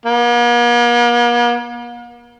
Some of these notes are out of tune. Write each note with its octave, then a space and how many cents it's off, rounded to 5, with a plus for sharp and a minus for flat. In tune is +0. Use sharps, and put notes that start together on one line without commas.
A#3 +45